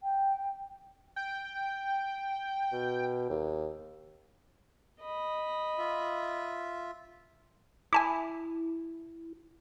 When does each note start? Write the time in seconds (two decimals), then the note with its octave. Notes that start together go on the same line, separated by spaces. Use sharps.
0.03 G5
1.16 G5
2.73 B2
3.30 D#2
5.01 D#5 B5
5.78 F4 E5
7.93 E4 G#5 A5 D6